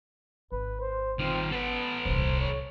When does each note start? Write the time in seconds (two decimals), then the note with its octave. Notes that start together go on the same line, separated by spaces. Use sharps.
0.52 G#1 B4
0.81 C5
1.19 D#3 C4 F4
1.52 B3 A4 B4
2.05 D#1 C2 C5
2.40 C#5